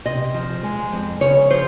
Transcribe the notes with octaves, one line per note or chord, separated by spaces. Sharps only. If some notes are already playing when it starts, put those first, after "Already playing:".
C3 D#5
F3
G#3
F2
C#3 C#5
F3 C5